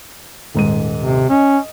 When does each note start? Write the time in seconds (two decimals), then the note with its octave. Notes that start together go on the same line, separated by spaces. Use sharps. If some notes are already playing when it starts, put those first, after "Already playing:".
0.55 D#1 G#2 D#7
0.99 C3
1.30 C#4 D#5